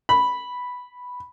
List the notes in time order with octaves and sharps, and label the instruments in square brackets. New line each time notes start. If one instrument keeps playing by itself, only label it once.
[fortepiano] B5